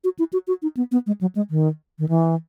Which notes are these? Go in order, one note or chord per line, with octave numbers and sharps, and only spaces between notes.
F#4
E4
F#4
F#4
D#4
B3
B3
G#3
F#3
G#3
D#3
D#3
E3